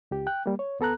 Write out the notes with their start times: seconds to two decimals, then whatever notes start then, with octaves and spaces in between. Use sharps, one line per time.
0.11 C#2 G4
0.27 G5 F#6
0.46 G3 A#3
0.59 C#5
0.80 D2 B3 A4 A#5 F#6